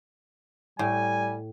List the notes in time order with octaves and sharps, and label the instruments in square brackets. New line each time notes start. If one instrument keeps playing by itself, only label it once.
[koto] A2 [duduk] G3 [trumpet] G#5